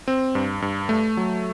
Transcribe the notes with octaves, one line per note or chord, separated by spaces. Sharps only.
C4
G2
G2
A3
F#3